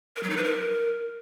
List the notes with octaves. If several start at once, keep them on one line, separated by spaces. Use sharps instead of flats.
A#4
F#3
D#4
B4
A#4